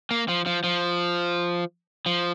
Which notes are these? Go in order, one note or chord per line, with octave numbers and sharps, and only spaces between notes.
A#3
F3
F3
F3
F3